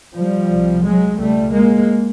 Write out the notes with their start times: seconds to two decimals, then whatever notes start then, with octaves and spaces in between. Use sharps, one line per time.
0.16 F3 G3
0.50 C2 C3
0.85 F#3 G#3
1.19 C#2 B2 G3 A3
1.53 G#3 A#3